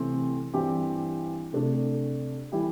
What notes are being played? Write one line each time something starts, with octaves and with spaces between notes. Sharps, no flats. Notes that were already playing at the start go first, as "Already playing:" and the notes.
Already playing: C3 E3 A3 C4 G4
G2 E3 C4 G4
C3 A3 D4 A4
E3 G3 E4 G4